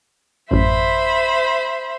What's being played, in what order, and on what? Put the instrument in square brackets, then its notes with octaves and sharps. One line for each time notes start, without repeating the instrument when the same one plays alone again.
[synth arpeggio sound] A1 F#2 [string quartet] C5 E5 B5